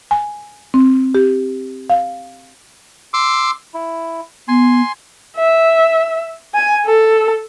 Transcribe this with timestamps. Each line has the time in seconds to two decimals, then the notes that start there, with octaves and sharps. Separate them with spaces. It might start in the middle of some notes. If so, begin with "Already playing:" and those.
0.11 G#5
0.74 C4
1.15 G4
1.90 F5
3.14 C6 D6 E6
3.74 E4
4.48 B3 G#5 C6
5.37 E5
6.55 G#5
6.86 A4